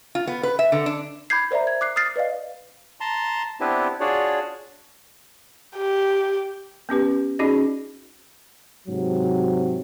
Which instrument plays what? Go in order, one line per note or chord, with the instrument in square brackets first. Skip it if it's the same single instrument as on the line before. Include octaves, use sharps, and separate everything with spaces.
[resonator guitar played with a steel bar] F4
B3
B4
E5
D3
D4
[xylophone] B5 D6 G6 G#6 C7
A#4 C5 D5 E5 A#5
G#6
D6 F#6 C7
D#6 F6 A6 C7
B4 D5 D#5 F5
[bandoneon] A5 A#5 C6
B3 C4 D4 E4 G4 B4
D4 F4 F#4 G#4 C#5 D5
[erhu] G4
[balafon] B3 C#4 G4 B4
C#4 D#4 F#4 G#4 D5 D#5
[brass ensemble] G#2 C3 F#3